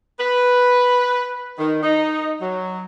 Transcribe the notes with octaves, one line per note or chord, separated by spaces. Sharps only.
B4
D#3
D#4
F#3